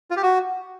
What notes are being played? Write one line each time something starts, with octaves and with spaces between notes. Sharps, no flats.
F4
G4
F#4